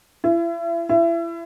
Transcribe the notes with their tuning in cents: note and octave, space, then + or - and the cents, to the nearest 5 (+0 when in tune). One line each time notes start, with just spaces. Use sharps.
E4 +35
E4 +30